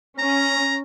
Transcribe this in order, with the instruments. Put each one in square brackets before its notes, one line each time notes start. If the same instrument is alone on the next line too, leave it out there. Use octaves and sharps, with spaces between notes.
[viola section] C#4 [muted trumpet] A#5